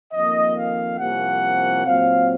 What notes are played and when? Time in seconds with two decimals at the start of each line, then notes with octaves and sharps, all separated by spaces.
0.13 F2 D#3 A#3 D#5
0.56 F5
0.98 C2 C3 F3 A#3 C#4 F#5
1.84 A#2 F#3 C4 F5